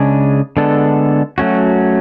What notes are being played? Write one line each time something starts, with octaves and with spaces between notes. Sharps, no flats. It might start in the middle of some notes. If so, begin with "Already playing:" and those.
Already playing: C#3 G#3 D4 G#4
D3 G#3 B3 D4 A4
F#3 A3 C#4 F#4